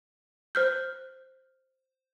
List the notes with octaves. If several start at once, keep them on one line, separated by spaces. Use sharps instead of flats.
C5 F6 G6